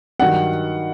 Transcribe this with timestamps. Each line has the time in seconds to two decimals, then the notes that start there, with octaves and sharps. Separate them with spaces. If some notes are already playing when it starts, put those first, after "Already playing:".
0.19 G2 D#3 F#3 F#5